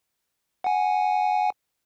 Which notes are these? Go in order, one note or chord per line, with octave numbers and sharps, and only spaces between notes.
F#5 G#5